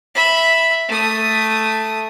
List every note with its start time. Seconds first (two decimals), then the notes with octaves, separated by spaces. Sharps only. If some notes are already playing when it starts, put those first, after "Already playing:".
0.15 E5 B5
0.88 A3 D#6